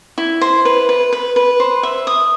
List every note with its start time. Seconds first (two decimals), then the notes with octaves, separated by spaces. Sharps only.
0.18 E4
0.41 C5
0.65 B4
0.89 B4
1.12 B4
1.36 B4
1.60 C5
1.83 E5
2.07 D#6